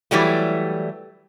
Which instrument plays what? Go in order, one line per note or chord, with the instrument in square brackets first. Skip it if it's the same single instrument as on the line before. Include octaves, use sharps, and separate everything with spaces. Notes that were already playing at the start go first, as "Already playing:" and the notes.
[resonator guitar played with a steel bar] E3 F#3 G3 A3